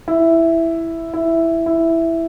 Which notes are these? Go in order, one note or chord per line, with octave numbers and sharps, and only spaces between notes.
E4
E4
E4